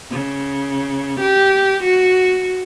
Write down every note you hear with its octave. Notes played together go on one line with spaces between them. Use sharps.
C#3
G4
F#4